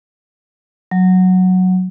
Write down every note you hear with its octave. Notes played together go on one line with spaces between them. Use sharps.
F#3